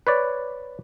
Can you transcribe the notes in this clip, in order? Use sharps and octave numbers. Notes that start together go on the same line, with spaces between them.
B4 C#5 D5